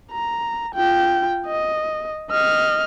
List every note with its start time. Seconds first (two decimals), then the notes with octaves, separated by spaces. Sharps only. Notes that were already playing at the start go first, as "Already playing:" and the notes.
0.12 A#5
0.75 F4 G5
1.47 D#5
2.30 D#5 F6